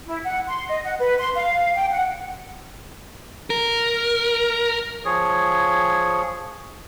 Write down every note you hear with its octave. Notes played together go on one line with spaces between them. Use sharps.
E4
F#5
C6
D#5
F#5
B4
C6
F5
G5
F#5
A#4
F3 G#4 C#5